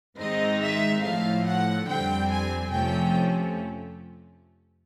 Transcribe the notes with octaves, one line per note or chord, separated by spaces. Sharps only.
G#2 D#3 G#3 C4 D#4 D#5
E5
A2 F3 A3 F5
F#5
F2 D3 G3 C4 G5
G#5
F2 C3 F3 A3 C#4 G5